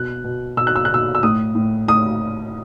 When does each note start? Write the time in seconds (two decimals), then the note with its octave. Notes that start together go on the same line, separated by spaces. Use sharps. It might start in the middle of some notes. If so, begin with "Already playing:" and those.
Already playing: B2 F#6
0.24 B2
0.57 B2 E6
0.67 F#6
0.76 E6
0.85 F#6
0.90 B2 E6
1.15 E6
1.23 A2 D#6
1.55 A2
1.88 A2 D#6